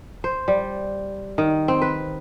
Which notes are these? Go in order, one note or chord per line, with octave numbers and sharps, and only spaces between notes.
C5
G3
D#3
C4
B4